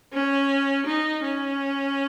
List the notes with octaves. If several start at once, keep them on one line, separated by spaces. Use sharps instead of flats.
C#4
D#4
C#4